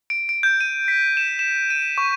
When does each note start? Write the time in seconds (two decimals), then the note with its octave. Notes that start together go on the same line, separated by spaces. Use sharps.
0.10 D7
0.29 D7
0.43 G6
0.61 D#7
0.88 B6
1.17 E7
1.39 E7
1.70 D#7
1.98 C#6